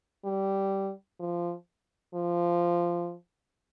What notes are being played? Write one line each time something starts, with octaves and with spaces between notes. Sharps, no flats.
G3
F3
F3